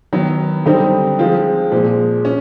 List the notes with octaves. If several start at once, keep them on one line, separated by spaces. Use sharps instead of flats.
D#3 F#3 B3
D3 G3 C4 D#4
F3 G#3 C4 F4
A#2 F3 G#3
C#4